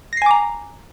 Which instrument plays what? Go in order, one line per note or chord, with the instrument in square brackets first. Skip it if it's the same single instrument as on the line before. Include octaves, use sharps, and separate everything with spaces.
[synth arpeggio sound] A#6
C7
G#5
D6
A#5